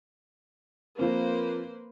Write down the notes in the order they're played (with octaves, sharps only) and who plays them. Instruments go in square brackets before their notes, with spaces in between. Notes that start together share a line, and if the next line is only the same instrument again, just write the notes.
[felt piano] F3 C4 [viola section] A#3 B4 C5